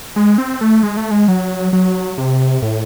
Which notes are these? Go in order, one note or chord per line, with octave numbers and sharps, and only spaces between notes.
G#3
C4
A3
G#3
A3
G#3
F#3
F#3
C3
A2